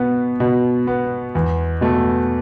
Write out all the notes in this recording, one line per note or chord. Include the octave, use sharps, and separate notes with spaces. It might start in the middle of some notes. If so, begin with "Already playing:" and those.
Already playing: B2 B3
B2
B3
E2
B2 A3